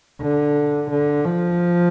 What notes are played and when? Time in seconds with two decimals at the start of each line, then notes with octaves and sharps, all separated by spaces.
0.21 D3
0.91 D3
1.25 F3